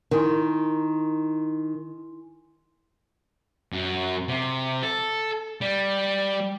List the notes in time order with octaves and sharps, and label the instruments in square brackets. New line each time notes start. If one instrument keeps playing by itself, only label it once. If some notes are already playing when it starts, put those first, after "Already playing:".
[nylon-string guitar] D#3 [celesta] E4 G#5 C6 [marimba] A#4
[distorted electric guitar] F#2
C3
A4
G3